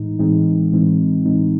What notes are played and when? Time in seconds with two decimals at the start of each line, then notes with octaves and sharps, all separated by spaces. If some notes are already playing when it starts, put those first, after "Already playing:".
Already playing: A2 E3 G#3 D#4
0.19 A2 E3 G#3 C4 D#4
0.72 A2 E3 G#3 C4 D#4
1.25 A2 E3 G#3 C4 D#4